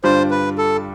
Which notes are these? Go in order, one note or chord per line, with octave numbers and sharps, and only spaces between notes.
G2 D3 G3 D4 F4 C5
B4
A4